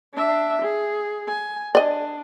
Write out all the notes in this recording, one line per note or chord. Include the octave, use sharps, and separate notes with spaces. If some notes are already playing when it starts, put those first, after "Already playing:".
D4 E5
G#4
G#5
D4 D5 D#5